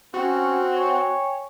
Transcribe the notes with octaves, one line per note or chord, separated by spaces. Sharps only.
C4 C#4 F#4
C#5 G5 G#5 C#6